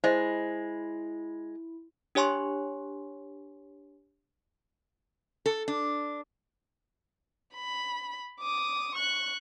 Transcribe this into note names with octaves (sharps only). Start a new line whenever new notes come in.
G#3 E4 C5 D#5
D4 G4 C#5 G#5 C6 C#6
A4
D4
B5
D6 D#6
C#6 F#6